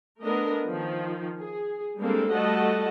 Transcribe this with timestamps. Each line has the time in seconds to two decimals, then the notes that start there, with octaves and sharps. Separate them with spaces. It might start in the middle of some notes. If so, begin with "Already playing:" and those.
0.23 A3 B3 D4 A#4 D#5
0.69 D#3 F3
1.39 G#4
1.99 G3 G#3 A#3 C4 D4 A4
2.31 G3 A3 F#4 D#5 F#5 A5